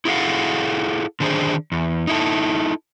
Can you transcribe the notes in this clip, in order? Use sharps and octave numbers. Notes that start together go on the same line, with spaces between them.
E4 G#4 A4 F5 F#5
D3 D#3 D4 G#4 C5
E2
D#4 E4 A4